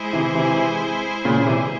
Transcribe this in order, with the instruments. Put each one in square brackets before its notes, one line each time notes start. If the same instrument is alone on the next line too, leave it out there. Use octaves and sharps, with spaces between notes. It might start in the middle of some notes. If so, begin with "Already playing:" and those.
Already playing: [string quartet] G#3 E4 G#4 C5
[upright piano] C3 E3
C3 E3
A#2 C#3
C3 E3